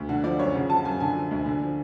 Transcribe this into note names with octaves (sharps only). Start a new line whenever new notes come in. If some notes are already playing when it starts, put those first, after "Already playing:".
Already playing: D2
D3 F#5
F3 D5
F#2 C#5
C#3 F#5
F3 A5
F#2 G#5
D3 G#5
F3
D2
D3
F3